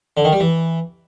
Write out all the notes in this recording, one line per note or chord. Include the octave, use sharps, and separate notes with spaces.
D3
D#3
G3
E3